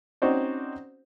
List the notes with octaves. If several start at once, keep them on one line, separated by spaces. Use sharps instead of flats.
C4 C#4 D#4 F#4 C5 D5